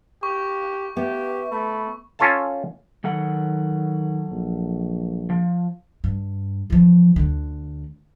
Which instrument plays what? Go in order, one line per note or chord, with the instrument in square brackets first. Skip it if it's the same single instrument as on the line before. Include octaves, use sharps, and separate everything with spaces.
[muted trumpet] G4 [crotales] C#6
[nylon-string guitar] B3 [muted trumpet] G4 [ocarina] E5
[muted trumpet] A3 [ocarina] B5
[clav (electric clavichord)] C#4 F4 A4 F5 A5
[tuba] D#3 [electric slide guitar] F#3 A4 F#5
[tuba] A#1
[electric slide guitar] F3
[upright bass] G2
E2 F3
D2 D3